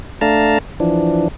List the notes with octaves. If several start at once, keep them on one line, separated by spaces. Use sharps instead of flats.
A3 D4 F5 A5 A#5
E3 F3 D4